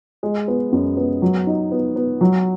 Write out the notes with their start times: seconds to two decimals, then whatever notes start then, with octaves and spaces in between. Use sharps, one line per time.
0.23 G#3
0.48 B3
0.72 F#2
0.97 B3
1.22 F#3
1.47 D#4
1.72 B3
1.96 B3
2.21 F#3